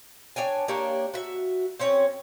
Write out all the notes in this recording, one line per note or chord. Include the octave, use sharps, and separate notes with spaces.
D4 C#5 G5 G#5
A#3 D4 G4 C#5
F#4 E5
C4 C#4 C#5